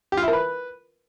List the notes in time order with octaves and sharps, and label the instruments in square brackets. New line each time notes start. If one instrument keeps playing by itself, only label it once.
[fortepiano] G4
F4
E4
A#4
B4